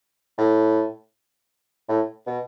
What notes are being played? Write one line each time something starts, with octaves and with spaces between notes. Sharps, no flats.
A2
A2
B2